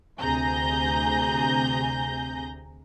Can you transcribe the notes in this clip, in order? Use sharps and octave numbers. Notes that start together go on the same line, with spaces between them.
D2 C3 G#4 A#5 G6 A#6